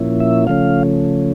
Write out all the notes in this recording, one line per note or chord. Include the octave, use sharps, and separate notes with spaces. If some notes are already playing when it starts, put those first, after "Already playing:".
Already playing: A#2 F3 A#3 C#4 E4
E5
C#3 F3 A3 C#4 F5